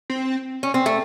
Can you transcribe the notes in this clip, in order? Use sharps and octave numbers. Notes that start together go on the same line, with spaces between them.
C4
C#4
C4
A3